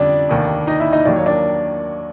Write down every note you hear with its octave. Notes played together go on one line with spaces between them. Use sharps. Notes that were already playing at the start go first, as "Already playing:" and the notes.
Already playing: F2 D3 G3 C#4 D4 D5
F1 D#2 D#3
D#4 D#5
E4 E5
D#4 D#5
D#2 D#3 F#3 A#3 D5
C#5
D4 D5